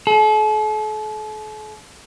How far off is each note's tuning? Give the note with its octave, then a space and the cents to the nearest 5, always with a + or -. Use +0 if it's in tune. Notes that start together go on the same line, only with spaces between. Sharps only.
A4 -45